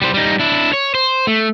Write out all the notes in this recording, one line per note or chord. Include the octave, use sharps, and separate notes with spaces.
G3 C5
G3 D#4
D4 E4
C#5
C5
A3